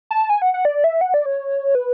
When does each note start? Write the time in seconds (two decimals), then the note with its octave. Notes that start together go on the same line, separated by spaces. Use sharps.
0.11 A5
0.30 G#5
0.42 F#5
0.54 F#5
0.65 D5
0.84 E5
1.01 F#5
1.14 D5
1.26 C#5
1.75 B4